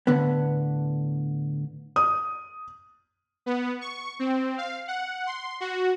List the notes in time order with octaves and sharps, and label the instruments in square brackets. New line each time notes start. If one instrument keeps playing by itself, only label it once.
[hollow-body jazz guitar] A2 D3 B3
[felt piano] D#6
[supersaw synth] B3
C#6
C4
F5
F#5
C6
F#4